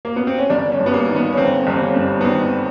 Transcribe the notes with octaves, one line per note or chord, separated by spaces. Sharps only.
A#3
B3
C4
C#4
G1 D4
C#4
G2
B3
A#3
D#3
B3
C#4
G1 C4
G1 C4
C#4
G2
B3
D#3 C4